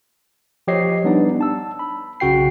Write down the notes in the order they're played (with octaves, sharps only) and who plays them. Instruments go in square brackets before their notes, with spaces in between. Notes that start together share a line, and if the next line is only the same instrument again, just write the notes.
[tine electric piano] F3 G4 C#5 D#5 C7
G3 B3 D4 D#4 D5
A5 E6
B5
B1 C#3 F#4 G5 C7